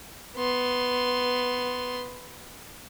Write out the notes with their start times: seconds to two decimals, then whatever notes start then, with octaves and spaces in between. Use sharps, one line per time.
0.36 B3 C6